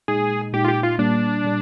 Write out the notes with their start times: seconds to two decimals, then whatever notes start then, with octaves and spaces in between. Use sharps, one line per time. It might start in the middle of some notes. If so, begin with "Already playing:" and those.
0.08 A#2 G#3 D#4 G#4
0.53 A#2 G#3 D#4 G4
0.64 F4
0.69 G4
0.84 F4
0.98 A#2 G3 A#3 D4
1.44 A#2 G3